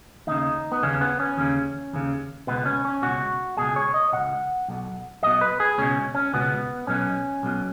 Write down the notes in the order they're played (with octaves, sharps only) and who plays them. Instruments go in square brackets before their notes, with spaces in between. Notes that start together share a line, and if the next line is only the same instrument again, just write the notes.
[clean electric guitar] D#2 C#3 D#4
B3
D#2 C#3 C#4
B3
C#4
D#2 C#3
D#2 C#3
C#2 B2 B3
C#4
C#4
C#2 B2 F#4
C#2 B2 G#4
C#5
D#5
C#2 B2 F#5
B1 B2
B1 B2 D#5
B4
G#4
C#2 B2 C#4
C#4
C#2 B2 B3
B1 B2 C#4
B1 B2